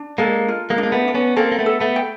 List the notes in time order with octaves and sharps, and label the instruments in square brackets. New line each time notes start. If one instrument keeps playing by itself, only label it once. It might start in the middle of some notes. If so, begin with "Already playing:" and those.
Already playing: [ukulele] D4
[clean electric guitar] G#3 A#3 [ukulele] A4
[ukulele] F4
[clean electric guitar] G#3 A#3
[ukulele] D4
[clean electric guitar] A#3
A3 B3
[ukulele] D4
[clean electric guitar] B3 C#4
[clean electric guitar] A#3 C4 [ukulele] A4
[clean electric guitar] A#3
A3 B3
[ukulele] A4
[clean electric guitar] A3 B3
[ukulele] G5